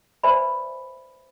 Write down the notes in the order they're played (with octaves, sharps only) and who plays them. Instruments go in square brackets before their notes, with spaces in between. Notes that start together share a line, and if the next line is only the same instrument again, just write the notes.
[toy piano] B4 C5 D5 E5 G#5 B5